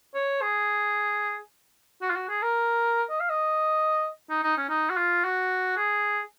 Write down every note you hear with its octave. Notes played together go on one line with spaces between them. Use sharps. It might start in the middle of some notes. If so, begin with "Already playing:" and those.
C#5
G#4
F#4
F4
F#4
G#4
A#4
D#5
F5
D#5
D#4
D#4
C#4
D#4
F#4
F4
F#4
G#4